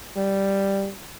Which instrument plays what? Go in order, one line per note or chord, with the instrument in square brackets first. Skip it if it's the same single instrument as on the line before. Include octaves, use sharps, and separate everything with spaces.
[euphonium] G3